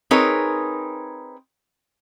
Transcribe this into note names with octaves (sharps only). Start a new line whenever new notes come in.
C4 D#4 G#4 A#4 B4 C#5